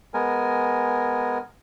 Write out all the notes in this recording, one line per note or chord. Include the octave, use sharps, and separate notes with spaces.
G#3 B3 A#4 G#5